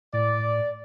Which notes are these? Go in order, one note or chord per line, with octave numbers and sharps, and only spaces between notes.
A2 D5